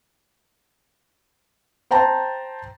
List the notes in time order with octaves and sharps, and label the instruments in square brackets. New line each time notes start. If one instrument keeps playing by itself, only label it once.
[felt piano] C5 G5 A5 A#5